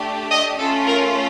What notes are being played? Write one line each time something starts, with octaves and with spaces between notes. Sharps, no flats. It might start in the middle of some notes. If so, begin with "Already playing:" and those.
Already playing: A3 D4 G4
D#5
A3 C#4 F4 A4
A#4